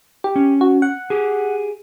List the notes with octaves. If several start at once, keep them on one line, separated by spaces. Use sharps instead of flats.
G4
C#4
F#4
F#5
G4 G#4